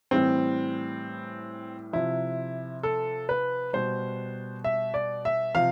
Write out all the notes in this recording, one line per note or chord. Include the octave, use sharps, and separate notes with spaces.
A2 E3 G3 C4
C3 F3 E4
A4
B4
B2 G3 C5
E5
D5
E5
C3 F3 F5